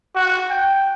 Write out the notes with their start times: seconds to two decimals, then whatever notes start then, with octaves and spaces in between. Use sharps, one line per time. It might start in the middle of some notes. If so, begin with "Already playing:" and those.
0.15 F#4
0.50 G5